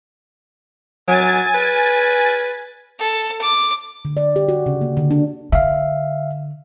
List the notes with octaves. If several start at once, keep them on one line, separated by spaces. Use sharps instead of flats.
F#3 G#5 A6
B4
A4
D6
D3
D5
G4
F#4
C#3
A#3
D3
D4
D3 E5 F5